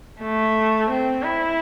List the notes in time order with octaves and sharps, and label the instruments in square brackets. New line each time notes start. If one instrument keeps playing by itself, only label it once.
[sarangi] A3
C4
E4